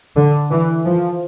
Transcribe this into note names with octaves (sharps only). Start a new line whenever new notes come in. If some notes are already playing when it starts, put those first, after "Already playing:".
D3
E3
F3